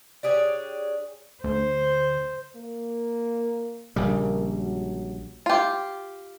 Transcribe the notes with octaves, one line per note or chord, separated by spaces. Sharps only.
D4 G4 G#4 C#5
D2 C5
A#3
A#1 C#3 G3 A#3
F#3
F4 G4